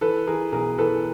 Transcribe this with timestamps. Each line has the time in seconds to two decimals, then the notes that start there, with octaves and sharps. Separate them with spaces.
0.01 E3 A4 B4
0.27 E3 G#4 A#4
0.52 B1 G#4 A#4
0.78 E3 A4 B4